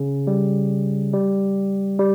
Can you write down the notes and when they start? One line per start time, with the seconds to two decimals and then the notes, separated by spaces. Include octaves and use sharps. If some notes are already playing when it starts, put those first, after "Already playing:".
Already playing: C#3
0.27 G3
1.13 G3
1.99 G3